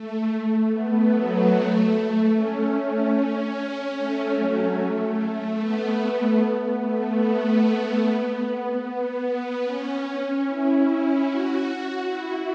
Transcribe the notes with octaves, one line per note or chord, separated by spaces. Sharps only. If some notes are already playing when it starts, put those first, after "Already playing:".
Already playing: A3
B3
F#3
A3
C#4
A3
F#3
A3
B3
B3
A3
B3
C#4
E4
F#4
E4